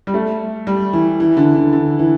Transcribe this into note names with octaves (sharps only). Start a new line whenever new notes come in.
G3
A3
G3
E3
E3
D3
D3
D3
E3